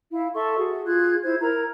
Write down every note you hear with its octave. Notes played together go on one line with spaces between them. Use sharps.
E4 F5
A4 E5 C6 C#6
F#4 G#4
F4 G#4 F#6 G#6
E4 C5 G#6
E4 A#4 A#5 G#6